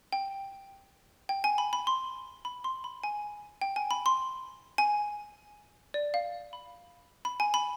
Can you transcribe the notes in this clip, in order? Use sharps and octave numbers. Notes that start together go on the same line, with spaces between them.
G5
G5
G#5
B5
B5
C6
B5
C6
B5
G#5
G5
G#5
B5
C6
G#5
D5
F5
B5
B5
G#5
B5